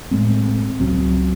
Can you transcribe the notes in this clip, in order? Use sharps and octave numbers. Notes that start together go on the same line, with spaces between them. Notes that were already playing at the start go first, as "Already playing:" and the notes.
A2 G#3 C4
C#2 C#3 F#3 C4